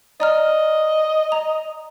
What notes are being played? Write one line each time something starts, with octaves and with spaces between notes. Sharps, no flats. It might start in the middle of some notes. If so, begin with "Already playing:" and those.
D5 D#5 A#5 F6
A#5